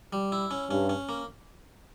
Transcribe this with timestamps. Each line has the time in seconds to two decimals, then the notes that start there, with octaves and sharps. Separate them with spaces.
0.13 G3
0.32 E4
0.51 C#4
0.70 G2 C#4
0.89 C#4
1.09 A#3